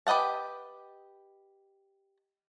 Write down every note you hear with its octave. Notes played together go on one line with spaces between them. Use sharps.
G4 B4 D#5 F#5 A5